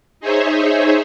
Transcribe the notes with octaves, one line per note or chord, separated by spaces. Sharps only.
D#4 G#4 C5 C#5 E5